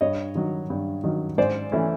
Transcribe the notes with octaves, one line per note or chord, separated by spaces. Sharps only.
G2 C#5 D#5
D#3 F#3
G2
D#3 F#3
G#2 C5 D5
E3 A3 C#4